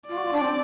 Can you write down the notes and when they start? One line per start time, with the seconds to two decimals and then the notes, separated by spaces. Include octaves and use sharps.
0.08 F4 D5
0.16 F#4
0.24 F4
0.32 D4
0.41 C4